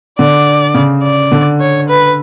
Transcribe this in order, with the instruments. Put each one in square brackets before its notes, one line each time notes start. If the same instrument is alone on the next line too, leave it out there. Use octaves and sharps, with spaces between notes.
[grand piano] D3 [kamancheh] D5
[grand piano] C#3
[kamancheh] D5
[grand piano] D3
[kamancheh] C#5
B4